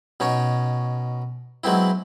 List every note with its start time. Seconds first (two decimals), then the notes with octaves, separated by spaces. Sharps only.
0.20 B2 C#4 D#4 C#5
1.64 F#3 G#3 B3 C4 E4